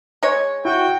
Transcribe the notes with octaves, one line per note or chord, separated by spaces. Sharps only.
G#3 C#5
E4 F#4 G5